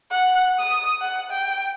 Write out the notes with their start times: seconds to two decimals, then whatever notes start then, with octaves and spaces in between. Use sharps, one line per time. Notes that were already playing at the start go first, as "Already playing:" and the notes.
0.11 F#5
0.60 D#6
1.01 F#5
1.31 G5